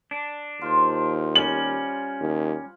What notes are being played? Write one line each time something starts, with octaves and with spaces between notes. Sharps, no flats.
D4
D#2 F4 C5
G3 C#4 F#7
D#2